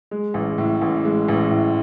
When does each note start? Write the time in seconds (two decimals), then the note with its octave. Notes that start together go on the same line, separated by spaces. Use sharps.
0.11 G#3
0.34 A1
0.58 A2
0.81 A1
1.05 G#3
1.28 A1
1.51 A2